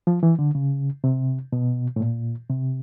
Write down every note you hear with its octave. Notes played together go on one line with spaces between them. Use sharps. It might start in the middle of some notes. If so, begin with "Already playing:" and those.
F3
E3
D3
C#3
C3
B2
A2
A#2
C3